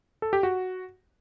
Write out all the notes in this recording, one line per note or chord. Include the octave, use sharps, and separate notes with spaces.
A4
G4
F#4